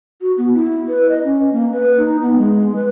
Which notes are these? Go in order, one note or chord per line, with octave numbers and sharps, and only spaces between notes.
F#4
B3
E4
B4
D#5
C#4
A#3
B4
D#4
B3
G#3
B4